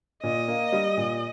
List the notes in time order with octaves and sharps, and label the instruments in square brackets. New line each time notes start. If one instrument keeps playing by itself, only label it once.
[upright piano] A#2 [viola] D#5
[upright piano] A#3
G3
A#2